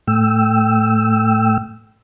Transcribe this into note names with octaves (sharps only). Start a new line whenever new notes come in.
A2 A3 G5 E6